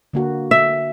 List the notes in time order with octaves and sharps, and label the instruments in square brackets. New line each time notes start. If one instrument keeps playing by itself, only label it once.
[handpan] D3 A#3 F#4
[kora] E5